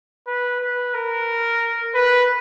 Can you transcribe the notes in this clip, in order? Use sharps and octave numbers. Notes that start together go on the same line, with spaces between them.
B4
B4
A#4
B4